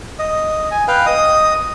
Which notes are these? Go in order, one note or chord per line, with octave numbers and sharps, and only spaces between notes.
D#5
G#5
B4 F5 G5
D#5 D#6